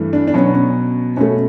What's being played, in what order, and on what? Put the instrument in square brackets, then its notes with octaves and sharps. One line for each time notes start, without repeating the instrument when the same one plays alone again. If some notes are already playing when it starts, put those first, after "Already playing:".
Already playing: [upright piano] G2 E3 A3
D4
D4
B2 F#3 B3 C#4
C#4
B2 A3 C#4